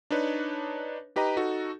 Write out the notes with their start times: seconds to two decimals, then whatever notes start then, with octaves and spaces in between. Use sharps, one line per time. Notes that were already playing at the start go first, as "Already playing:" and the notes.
0.11 D4 D#4 B4 C#5
1.16 D#4 G4 B4 D#5 A#5
1.37 D#4 F#4 A4